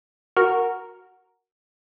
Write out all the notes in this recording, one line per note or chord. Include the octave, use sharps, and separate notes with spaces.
F#4 A#4